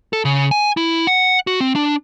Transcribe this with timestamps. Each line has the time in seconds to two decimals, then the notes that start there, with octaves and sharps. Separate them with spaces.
0.13 A4
0.25 C#3
0.51 G#5
0.77 E4
1.07 F#5
1.47 F#4
1.60 C4
1.76 D4